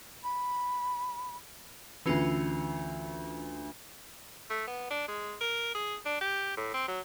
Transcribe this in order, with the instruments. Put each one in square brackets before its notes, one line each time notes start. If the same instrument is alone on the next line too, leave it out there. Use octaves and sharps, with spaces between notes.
[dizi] B5
[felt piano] D2 B4 [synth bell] E3 C#4 F4
[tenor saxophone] A3
B3
D4
G#3
A#4
G#4
D4
G4
A2
C4
F#3